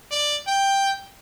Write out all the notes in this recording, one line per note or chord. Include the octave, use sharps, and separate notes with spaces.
D5
G5